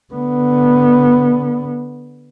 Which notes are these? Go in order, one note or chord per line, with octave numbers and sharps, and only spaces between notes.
D3 B3